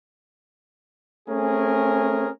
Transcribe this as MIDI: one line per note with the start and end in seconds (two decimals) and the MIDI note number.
1.29 2.29 57
1.29 2.29 60
1.29 2.29 61
1.29 2.29 68
1.29 2.29 70